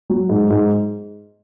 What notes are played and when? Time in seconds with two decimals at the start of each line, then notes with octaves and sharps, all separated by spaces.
0.10 F#3
0.29 G#2
0.50 G#2